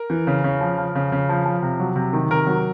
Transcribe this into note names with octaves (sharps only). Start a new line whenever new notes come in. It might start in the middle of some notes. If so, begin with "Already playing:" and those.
Already playing: A#4
E3
C#3
C#3
F3
F3
C#3
C#3
F3
F3
C3
F#3
C3
D#3
C3 A#4
F#3